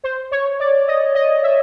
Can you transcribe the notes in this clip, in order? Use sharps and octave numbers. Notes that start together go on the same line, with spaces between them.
C5
C#5
D5
D#5
D#5
E5